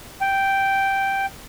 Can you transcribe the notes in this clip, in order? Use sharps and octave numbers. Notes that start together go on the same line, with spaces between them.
G5